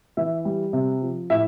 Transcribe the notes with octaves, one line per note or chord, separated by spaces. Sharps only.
E3 E5
G3
C3
F3
A2 E5